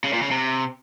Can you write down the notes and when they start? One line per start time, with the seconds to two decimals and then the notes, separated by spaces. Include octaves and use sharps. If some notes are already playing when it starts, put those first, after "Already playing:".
0.04 C#3
0.13 A#2
0.22 C#3
0.31 C3